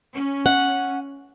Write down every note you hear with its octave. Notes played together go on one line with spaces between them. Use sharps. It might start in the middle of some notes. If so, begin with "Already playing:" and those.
C#4
F#5